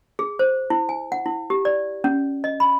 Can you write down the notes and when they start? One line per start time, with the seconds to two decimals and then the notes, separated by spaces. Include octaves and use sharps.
0.19 G#4
0.39 C5
0.70 E4
0.89 G#5
1.12 F#5
1.26 E4
1.50 G4
1.65 D5
2.04 C#4
2.44 D#5
2.60 B5